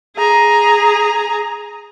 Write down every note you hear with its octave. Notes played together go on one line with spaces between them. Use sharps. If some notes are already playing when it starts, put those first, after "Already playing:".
G#4 A#5